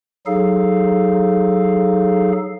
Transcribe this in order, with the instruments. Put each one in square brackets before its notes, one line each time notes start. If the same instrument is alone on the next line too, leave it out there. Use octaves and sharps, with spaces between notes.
[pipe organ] F#3 D#4 G#4 A4 F5